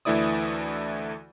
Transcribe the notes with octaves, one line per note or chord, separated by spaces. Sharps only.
D2 E3 A3 E4 D5 D#6